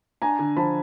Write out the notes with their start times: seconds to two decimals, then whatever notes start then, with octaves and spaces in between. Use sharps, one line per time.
0.22 D4 G#5 A#5
0.39 D3
0.56 F3 A5 B5